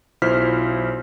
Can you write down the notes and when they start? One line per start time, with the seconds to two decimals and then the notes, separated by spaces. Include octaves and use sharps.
0.22 B1 E4 F4 C5 F6 B6